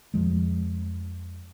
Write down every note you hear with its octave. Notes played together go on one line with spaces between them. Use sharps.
F2 F3 G#3